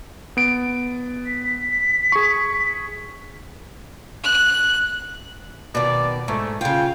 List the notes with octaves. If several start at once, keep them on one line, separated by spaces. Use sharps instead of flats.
B3 D7
B6
G#4 C#6
F#6
B2 D#3 D5
G#2 A3
C#3 F4 G5